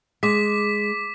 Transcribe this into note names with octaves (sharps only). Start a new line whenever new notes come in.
G#3 D6 B6